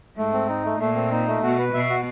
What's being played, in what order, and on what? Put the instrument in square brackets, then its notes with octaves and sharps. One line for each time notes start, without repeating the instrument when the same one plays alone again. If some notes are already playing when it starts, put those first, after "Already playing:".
[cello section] G#2 [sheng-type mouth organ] A3
[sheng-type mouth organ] C4
D#4
A3
[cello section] A#2 [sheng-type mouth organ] A3
[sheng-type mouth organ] C4
D#4
A3
[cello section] B2 [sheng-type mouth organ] F#4
[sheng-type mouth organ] B4
[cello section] B2 [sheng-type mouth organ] E5
[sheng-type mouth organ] F#4